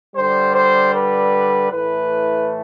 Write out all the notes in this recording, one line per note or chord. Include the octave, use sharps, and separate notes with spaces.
D3 G3 C5
C5
B4
A2 E3 A3 B4